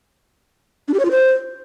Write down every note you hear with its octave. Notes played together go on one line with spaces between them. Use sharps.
D4
G4
C#5
F4
C5